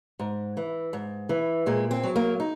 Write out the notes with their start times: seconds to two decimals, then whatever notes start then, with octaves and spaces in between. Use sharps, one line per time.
0.19 G#2
0.57 E3
0.93 G#2
1.29 E3
1.66 A#2 G#3
1.91 C4
2.03 F#3
2.16 A#3
2.40 D#4